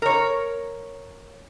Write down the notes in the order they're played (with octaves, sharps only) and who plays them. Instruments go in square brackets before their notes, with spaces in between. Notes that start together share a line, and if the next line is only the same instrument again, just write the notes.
[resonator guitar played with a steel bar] A#4 C#5